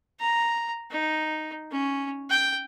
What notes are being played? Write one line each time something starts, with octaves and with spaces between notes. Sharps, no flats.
A#5
D#4
C#4
G5